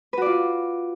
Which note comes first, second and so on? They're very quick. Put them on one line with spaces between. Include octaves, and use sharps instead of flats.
B4 F#4 D5 F4